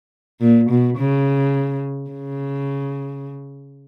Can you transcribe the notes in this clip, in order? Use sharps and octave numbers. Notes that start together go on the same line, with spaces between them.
A#2
B2
C#3
C#3